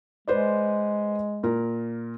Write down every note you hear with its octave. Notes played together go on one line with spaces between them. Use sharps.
G#3 B4 C5 D5
A#2 A#4